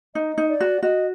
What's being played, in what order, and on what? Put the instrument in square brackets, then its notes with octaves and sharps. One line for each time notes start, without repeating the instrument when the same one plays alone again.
[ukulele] D#4 [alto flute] D#5
[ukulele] D#4
[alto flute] D5
[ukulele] F#4
[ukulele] F#4 [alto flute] D#5